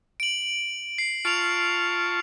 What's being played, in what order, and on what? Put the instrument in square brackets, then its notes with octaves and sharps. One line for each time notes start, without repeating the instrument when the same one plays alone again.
[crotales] D7 F#7
F#7
C7
[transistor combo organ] F4 A5 C#6 [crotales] D7 F7